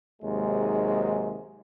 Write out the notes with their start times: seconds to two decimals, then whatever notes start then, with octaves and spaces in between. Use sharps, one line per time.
0.22 D#2 G#2 C3 F#3 G#3